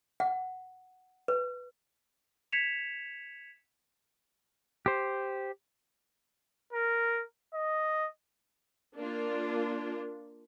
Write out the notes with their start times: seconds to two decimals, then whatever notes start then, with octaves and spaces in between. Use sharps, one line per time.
0.20 F#5
1.28 B4
2.52 G#6 B6 C#7 E7 F7
4.86 G4 C5
6.73 A#4
7.54 D#5
8.98 A#3 D4 F4